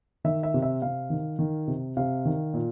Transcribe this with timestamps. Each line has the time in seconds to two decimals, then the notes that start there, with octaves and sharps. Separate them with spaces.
0.24 D#3 E5
0.43 E5
0.54 C3
0.62 E5
0.82 C3 F5
1.10 D#3
1.39 D#3
1.68 C3
1.97 C3 F5
2.25 D#3
2.54 A#2